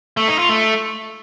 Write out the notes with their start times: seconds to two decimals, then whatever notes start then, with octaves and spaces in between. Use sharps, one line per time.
0.17 A3
0.28 D#4
0.38 F4
0.49 A3